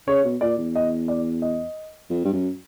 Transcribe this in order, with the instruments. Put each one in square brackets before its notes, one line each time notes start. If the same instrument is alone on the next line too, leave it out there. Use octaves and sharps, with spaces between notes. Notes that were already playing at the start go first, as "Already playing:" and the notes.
[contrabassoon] C#3 [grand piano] C#5
[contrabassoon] B2
[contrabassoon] A#2 [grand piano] D5
[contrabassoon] E2
[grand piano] D#5
D5
D#5
[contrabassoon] F2
G2
F#2